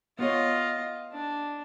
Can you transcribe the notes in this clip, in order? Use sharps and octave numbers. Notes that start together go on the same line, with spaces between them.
B3 F4 C#5 D#5
D4